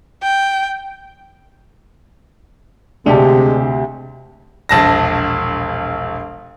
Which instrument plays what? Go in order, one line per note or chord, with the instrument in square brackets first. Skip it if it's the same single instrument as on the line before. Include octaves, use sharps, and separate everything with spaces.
[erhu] G5
[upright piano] D2 G4 A5 [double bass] C3 [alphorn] G#3 [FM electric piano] D4
[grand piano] E1 A#1 A5 A#6